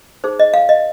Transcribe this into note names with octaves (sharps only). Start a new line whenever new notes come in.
D#4 G#4 C5
D#5
F5
D#5